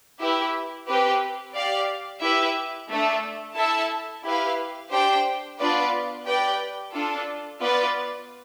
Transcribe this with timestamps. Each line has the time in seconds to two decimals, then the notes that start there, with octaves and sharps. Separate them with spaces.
0.19 E4 G4 B4 E5
0.87 C4 G4 B4
1.54 G4 D5 F5
2.22 E4 G4 B4 E5
2.89 A3 D4 A4
3.56 E4 A4 E5 A5
4.24 E4 G4 B4 F5
4.91 D4 G4 C5 G5
5.59 B3 D4 F4 B4 D5
6.26 G4 B4 D5 G5
6.94 D4 F4 A4
7.60 B3 F4 B4 D5